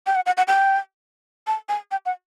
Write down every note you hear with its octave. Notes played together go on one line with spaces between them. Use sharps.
G5
F#5
F#5
F#5
G5
A5
G#5
G5
F#5